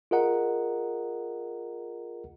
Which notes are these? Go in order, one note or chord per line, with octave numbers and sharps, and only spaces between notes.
F4 G#4 A#4 D#5 F#5 A#5